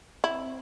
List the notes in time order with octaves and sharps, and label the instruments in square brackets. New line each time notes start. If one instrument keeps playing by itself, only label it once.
[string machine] C4 [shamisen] E4